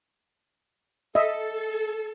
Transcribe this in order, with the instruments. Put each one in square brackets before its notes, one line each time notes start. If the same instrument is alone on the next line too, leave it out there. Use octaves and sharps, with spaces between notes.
[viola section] A4 [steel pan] D#5 E5